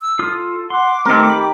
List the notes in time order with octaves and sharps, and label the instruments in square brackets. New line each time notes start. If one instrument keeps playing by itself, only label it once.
[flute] E6
[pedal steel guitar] F4 D#6 F6 [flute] A4
[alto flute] F#5 [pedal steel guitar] C6 [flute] D6
[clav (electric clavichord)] D#3 A#4 [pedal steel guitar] A3 G4 [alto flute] C4
[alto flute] G4 [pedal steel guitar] B5